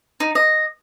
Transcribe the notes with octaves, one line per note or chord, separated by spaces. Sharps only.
D#4
D#5